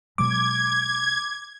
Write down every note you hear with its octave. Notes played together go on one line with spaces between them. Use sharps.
B2 F#3 G#3 D6 G#6